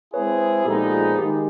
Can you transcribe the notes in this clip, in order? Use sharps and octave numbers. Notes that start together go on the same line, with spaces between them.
G#3 C4 E4 G#4 B4 C#5
A#2 F3 G#3 B3 D#4 G4 A4
G#4
G#4
D#3 G#3 G4